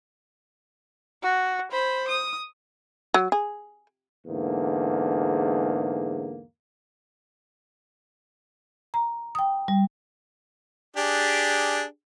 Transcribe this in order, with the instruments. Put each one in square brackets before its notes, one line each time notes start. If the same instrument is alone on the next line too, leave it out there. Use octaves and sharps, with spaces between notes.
[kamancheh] F#4
C5 B5
D#6
[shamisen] F#3
G#4
[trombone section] E2 G#2 D3 A#3
[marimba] A#5
G5 D#6
G3
[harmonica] D4 G4 G#4